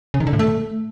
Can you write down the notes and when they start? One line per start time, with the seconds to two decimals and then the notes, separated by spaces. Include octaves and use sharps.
0.14 C#3
0.20 D#3
0.27 D3
0.33 A2
0.39 A3